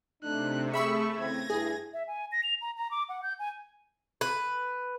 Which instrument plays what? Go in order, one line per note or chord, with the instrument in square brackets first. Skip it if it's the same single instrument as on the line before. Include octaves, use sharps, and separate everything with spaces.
[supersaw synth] C3 [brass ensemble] A3 D4 D#4 [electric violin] F#6
[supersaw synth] A3 [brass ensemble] G#4 [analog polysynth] E5 B5 E6 [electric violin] C#6
[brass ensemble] C#3 E3 C4 [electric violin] G#6 [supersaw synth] A#6
[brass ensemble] G2 E4 [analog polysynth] G#4
[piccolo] E5
G#5
A#6
F7
A#5
A#5
D6
F#5
G6
G#5
[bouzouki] B4